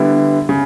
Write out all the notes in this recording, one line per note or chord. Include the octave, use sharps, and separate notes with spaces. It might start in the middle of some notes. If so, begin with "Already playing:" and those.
Already playing: D3 G3 B3 E4
C#3